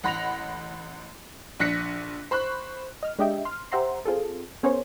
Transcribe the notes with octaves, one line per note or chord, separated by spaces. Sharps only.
A1 F#5 B5 A#6 F7
A#1 D4 F#6 A#6 B6 C#7
C5 B5 C#6 F#6
D#5 F6
G#3 D4 G4 D#5 E5 G5
C6 F6
G4 C5 E5 F#5 A#5 C6
C4 F4 G#4 A4
B3 C#4 G#4 A#4 C5 C#5